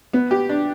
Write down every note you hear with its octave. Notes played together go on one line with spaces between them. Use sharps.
B3
G4
D4